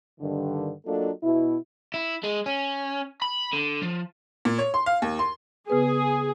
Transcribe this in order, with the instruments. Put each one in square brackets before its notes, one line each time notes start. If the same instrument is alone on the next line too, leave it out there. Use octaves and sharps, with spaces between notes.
[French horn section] G2 D3 D#3
F#3 A#3 D4 F4 A4 D#5
B2 E4
[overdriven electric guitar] E4
G#3
C#4
B5
D3
F3
[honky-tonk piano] A#2
C#5
C6
F5
D#2
C6
[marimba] C#3 B3 B4 [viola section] G#4